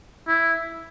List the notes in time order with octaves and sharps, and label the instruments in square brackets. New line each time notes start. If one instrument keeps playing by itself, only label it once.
[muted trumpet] E4